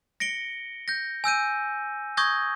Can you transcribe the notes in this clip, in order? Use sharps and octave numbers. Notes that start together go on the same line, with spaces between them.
A#6 C#7 D7 G7
G6 A#6
G#5 E6 G6 D#7
C#6 D#6 G6 G#6 A#6